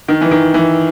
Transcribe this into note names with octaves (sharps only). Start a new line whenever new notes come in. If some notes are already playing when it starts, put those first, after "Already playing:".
D#3
E3
D#3
E3